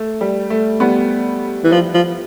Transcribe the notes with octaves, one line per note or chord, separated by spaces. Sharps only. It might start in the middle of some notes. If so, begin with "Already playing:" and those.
Already playing: A3
G3
A3
G3 B3
E3
F3
F3